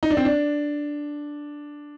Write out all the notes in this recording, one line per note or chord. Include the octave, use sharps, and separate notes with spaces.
D#4
D4
C4
D4